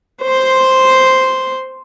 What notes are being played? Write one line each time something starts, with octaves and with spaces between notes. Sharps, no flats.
C5 C6